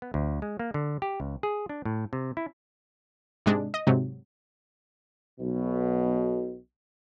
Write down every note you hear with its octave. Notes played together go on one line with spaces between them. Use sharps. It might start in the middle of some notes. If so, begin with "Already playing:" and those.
B3
D2
G#3
A#3
D3
G4
C#2
G#4
D4
A2
C3
E4
G#2 C3 G#3 D4
D#5
G#2 C3 F#3
B1 B2